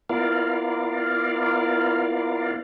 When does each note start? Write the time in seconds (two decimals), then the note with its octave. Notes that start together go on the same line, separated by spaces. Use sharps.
0.10 B3 E4 F4 A#4 D5 F5